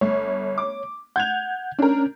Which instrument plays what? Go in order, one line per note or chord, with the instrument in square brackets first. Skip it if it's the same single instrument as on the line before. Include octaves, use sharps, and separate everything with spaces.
[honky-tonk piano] G1 [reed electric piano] C#5
[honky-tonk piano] D6
[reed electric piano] F#5 [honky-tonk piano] G6 G#6 F7
[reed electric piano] C#4 [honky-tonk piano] D4 A#4